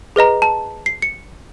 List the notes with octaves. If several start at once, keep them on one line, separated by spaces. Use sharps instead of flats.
G#4 B4 D#5 A#5
A5
C7
C#7